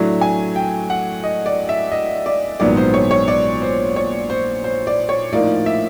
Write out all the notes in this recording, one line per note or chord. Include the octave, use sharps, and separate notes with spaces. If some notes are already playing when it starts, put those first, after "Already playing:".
Already playing: A2 F#3 A3 D4
G#5
G5
F#5
D#5
D5
E5
D#5
D5
A#1 G#2 D#3 F#3 B3 D5
C5
C#5
C#5
D5
C5
C#5
C5
C5
D5
C#5
A2 F3 A#3 D#4 D5
E5